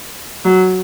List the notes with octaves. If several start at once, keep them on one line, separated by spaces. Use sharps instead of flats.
F#3